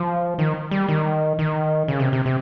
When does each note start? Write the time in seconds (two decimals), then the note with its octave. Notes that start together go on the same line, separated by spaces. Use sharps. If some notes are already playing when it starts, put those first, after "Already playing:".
Already playing: F3
0.39 D#3
0.71 G3
0.88 D#3
1.39 D#3
1.88 C#3
2.00 C3
2.13 C3
2.26 C3